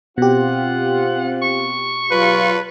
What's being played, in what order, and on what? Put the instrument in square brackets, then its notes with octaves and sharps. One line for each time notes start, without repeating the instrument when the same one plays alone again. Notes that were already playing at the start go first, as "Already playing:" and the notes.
[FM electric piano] B2 G4 [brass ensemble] C4 F4 [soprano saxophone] F#5
[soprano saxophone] C#6
[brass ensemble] F#3 F4 [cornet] B4